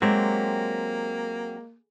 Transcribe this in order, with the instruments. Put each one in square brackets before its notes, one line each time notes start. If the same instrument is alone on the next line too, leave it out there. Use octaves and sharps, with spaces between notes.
[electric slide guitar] F#3 C4 G4 [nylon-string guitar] G#3 [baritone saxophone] A#3